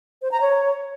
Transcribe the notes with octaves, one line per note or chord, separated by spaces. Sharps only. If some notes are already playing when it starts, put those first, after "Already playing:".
C5
A#5
C#5